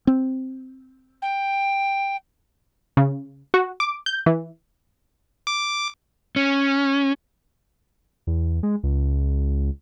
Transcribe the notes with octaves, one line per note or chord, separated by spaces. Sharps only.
C4
G5
C#3
F#4
D6
G6
E3
D6
C#4
E2
G#3
C#2